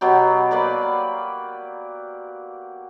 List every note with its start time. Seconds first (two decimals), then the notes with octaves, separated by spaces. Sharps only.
0.01 B2 F#3 G4
0.51 A#3 B4 D5